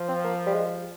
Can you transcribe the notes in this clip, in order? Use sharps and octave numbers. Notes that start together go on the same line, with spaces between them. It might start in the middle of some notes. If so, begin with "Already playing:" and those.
Already playing: F3
C4
A#3
G3
G#3